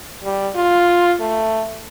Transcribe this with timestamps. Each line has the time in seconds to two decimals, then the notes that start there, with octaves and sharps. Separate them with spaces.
0.24 G3
0.55 F4
1.20 A3